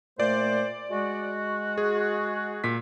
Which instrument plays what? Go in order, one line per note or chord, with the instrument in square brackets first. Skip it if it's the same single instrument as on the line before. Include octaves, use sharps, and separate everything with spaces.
[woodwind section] A#2 A3 C5 [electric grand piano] D5
[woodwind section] G#3 F#4
[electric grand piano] G#4
A#2 B6